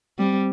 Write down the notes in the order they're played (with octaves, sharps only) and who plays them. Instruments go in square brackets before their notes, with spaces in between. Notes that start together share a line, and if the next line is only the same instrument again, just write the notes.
[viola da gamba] G3 [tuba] C4